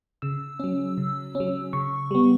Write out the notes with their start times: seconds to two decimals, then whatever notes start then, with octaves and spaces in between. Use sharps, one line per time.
0.22 C#3 E6
0.60 F#3 C#4
0.98 C#3
1.35 C#4
1.40 F#3
1.73 C#3 C#6
2.11 G3 B3